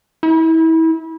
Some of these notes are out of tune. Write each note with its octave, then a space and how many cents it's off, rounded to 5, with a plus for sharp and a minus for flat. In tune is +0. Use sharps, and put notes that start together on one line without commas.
E4 -30